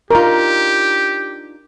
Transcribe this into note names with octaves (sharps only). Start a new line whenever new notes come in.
D4 D#4 F4 G4 A#4